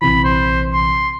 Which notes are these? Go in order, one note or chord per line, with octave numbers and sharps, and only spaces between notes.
A#1 C3 E3 B5
C5
C6